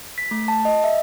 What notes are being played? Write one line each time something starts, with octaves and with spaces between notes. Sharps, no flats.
B6
A3
A5
D#5
E5